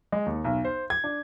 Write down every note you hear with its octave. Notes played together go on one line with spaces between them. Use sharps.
G#3
D#2
B1
C5
G#6
D4